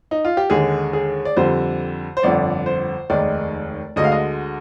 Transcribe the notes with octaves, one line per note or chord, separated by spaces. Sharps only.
D#4
F4
G4
D#2 D3 G#3 G#4
G#4
D5
F2 D3 G3 C5
C5
G1 F2 D3 D5
C5
F1 D#2 D#3 G#3 D5
D2 D3 G#3 D#5
F5
D#5